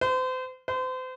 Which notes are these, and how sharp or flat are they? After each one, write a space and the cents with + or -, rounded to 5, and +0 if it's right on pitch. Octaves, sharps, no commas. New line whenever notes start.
C5 -35
C5 -35